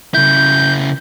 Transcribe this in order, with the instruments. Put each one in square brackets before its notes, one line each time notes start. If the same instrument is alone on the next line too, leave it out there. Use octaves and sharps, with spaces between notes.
[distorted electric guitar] C#3 E4 [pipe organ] G6